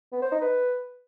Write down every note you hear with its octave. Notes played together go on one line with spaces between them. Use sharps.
B3
C5
D#4
B4